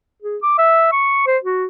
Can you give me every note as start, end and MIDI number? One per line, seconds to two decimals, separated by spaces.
0.23 0.37 68
0.43 0.56 86
0.58 0.92 76
0.92 1.26 85
1.27 1.38 72
1.44 1.66 66